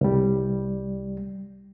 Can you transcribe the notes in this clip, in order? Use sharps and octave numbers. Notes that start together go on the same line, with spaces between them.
C2 G3